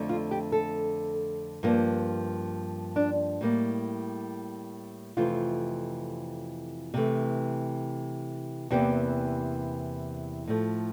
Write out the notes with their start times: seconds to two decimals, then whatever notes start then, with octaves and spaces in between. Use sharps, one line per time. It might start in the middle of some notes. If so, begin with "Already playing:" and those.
Already playing: F2 D3 A3
0.09 F4
0.31 G4
0.52 A4
1.63 G2 F3 A#3
2.96 D4
3.41 A2 G3 A#3
5.17 F2 C3 E3 A3 F4
6.94 C3 E3 A3
8.71 E2 C3 E3 A#3 G4
10.47 A2 F3 A3